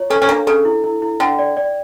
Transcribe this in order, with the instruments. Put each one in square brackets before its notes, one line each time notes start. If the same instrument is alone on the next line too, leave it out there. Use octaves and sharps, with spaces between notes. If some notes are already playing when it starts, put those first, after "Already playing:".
Already playing: [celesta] F4 C#5
[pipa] C#4 [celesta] A4
[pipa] C#4
[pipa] A#3 [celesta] D4
[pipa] C#3 [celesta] A4
[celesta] E4
E4
E4
[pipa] D3 [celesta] G5
[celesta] D5
D5